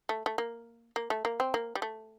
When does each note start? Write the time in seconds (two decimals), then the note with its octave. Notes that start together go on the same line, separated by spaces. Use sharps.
0.09 A3
0.26 A3
0.38 A#3
0.96 A#3
1.10 A3
1.25 A#3
1.40 C4
1.54 A#3
1.75 G3
1.82 A3